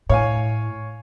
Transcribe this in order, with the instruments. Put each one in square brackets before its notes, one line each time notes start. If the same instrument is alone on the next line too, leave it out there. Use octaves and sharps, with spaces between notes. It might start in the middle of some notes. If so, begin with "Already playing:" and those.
[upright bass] A2 [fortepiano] C#5 F5 G#5